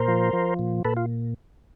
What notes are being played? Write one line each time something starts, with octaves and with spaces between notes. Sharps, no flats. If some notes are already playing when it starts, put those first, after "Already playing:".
Already playing: A#2 A#4 C5
F3
F3
A#2
A#2 A4 B4
F4